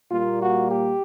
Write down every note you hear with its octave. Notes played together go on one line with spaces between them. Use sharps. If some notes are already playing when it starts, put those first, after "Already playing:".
A#2 G3 A#3 F4
F#4
G4